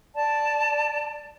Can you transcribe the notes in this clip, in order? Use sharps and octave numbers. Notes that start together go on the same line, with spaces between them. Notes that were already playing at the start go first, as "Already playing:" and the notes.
D5 A5